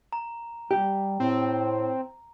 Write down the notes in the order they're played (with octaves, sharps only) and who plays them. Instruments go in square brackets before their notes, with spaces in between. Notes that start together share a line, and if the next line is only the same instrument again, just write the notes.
[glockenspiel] A#5
[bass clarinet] G3 [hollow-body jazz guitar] G4
[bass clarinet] A2 [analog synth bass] C4